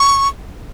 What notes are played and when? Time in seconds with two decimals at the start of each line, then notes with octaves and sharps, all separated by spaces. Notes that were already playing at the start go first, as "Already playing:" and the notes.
Already playing: C#6